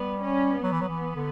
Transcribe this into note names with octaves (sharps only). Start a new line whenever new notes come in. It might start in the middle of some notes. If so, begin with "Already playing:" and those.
Already playing: G3 B3
C#4
F#3 B3
E3
F#3
E3
D3